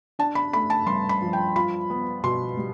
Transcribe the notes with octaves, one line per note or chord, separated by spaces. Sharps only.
D4 A5
B5
A3 B5
A5
G2 C6
B5
F3
G5
F4 B5
B3
B2 C6
G3